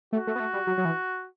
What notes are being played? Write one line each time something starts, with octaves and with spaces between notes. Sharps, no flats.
A3 F#4
A3
B3
A3
G3
F#3
F#3
E3